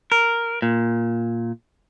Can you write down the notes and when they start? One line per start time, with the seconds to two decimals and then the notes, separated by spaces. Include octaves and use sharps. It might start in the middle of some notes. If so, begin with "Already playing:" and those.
0.12 A#4
0.62 A#2